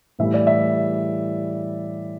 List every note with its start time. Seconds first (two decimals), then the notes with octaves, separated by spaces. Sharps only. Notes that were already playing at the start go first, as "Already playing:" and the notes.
0.19 A2 E3 G3 E5
0.34 D5
0.47 E5